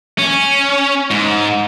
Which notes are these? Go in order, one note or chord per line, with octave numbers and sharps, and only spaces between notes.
C#4
G#2